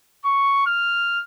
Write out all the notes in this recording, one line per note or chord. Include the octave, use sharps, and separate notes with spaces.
C#6
F6